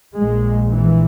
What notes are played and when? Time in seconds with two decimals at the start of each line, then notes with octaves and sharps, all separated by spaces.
0.18 A#1 A#2 G#3
0.73 E3